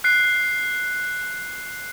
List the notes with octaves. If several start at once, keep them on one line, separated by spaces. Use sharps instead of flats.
F#6 C7